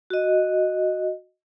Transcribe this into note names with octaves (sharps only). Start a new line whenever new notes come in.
F#4 D#5